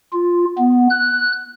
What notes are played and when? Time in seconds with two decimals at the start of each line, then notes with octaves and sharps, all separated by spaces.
0.12 F4
0.58 B3
0.90 F#6